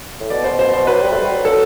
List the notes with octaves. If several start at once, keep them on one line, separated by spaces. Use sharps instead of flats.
A2
B2 D5
B2 C5
B2 C5
B2 C5
F#3 B4
G3
A3
G3
F#3
A4